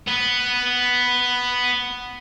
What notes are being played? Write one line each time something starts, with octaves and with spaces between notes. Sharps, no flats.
B3 B4